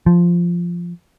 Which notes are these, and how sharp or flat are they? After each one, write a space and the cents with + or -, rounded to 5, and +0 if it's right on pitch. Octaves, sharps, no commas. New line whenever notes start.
F3 -5